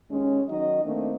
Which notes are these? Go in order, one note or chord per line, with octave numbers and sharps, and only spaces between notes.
D#2 G#3 C#4
D#3 F#3 D#4 D#5
D#3 A3 A#3 C4 D4